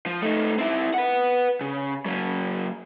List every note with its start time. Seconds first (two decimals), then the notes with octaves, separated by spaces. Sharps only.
0.06 F3
0.22 A3 D#4
0.58 C4 E4
0.94 B4 F#5
1.61 C#3
2.06 F#3 A#3